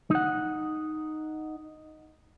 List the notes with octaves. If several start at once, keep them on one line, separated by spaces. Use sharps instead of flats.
D#4 F#5